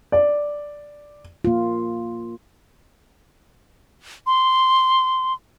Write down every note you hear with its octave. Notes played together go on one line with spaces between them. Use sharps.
D5
A#3 F4
C6